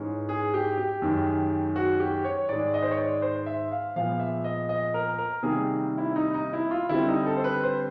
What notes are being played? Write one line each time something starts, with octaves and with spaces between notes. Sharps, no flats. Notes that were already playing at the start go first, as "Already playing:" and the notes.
Already playing: G#2 E3 G#3 C#4
G#4
G4
G4
F#2 D#3 G#3
F#4
G4
C#5
G#2 D#3 G#3 D5
D#5
C5
C#5
D5
C5
E5
F5
A#2 F3 G#3 B3 F5
E5
D#5
D#5
A#4
A#4
C3 D#3 G3 A#3 G#4
E4
D#4
D#4
E4
F4
D3 G3 C4 E4
D#4
A4
C5
B4
C5